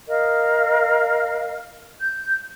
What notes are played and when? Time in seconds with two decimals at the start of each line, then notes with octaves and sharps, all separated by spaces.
0.08 A#4 D#5 F5
1.99 G6